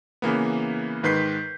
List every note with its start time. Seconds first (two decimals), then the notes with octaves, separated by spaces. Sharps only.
0.22 C#3 E3 A#3 B3
1.03 G#2 D#3 B4 G6 B6 C7